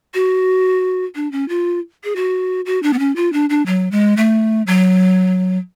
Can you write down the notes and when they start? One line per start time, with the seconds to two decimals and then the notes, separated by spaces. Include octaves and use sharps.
0.14 F#4
1.15 D4
1.32 C#4
1.49 F4
2.04 G#4
2.16 F#4
2.66 F#4
2.83 D4
2.93 B3
2.99 C#4
3.16 F4
3.33 D4
3.50 D4
3.66 F#3
3.92 G#3
4.17 A3
4.67 F#3